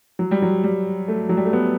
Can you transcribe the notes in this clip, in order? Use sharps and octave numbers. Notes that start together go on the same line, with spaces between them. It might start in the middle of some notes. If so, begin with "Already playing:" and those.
F#3
G3
F#3
G3
A3
F#3
G3
A3
B3